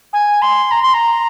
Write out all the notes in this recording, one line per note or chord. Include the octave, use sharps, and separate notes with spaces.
G#5
C6
A#5
C6
A#5